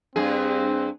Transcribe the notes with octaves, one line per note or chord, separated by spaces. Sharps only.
G2 C4 G#4